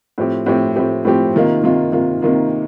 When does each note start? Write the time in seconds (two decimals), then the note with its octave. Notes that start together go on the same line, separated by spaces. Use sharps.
0.18 A2 F3 C4 G4
0.46 A2 F3 C4 G4
0.76 A2 F3 C4 G4
1.05 A2 F3 C4 G4
1.34 C3 D#3 A#3 F4
1.63 C3 D#3 A#3 F4
1.92 C3 D#3 A#3 F4
2.22 C3 D#3 A#3 F4